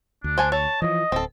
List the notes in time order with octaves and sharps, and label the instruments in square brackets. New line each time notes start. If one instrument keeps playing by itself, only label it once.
[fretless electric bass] D2 [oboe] D4
[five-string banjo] C5 G#5 A5
[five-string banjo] C#5 [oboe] A5
[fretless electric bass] E3 F3 [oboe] D#5
[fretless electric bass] D1 [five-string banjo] C4 A4